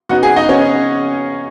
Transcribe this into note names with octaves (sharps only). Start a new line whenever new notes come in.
C#3 B3 D#4 F#4 F#5
G#4 G#5
D#4 D#5
C#3 B3 C#4 D#4 C#5